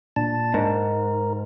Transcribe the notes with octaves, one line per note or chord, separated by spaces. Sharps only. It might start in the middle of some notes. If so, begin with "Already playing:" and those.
A#2 D4 A5
G#2 A#4